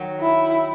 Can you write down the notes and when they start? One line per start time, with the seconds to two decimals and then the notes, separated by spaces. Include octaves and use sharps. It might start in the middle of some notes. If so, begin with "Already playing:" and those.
Already playing: D#3 F#3
0.21 E4